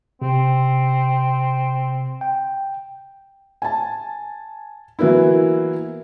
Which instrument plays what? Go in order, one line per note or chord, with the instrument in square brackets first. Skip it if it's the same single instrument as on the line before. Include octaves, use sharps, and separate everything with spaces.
[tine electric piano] C3 [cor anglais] C4
[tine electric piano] G5
[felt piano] G#5 A5
E3 F#3 A#3 B3 E4